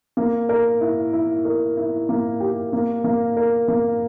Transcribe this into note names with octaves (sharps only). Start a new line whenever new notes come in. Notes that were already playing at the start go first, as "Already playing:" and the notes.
A#3
A#4
E4
E4
A#4
E4
A#3
G4
A#3
A#3
A#4
A#3